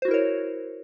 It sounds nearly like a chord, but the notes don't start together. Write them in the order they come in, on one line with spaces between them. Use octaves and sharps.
C5 F#4 E4 A#4 C#5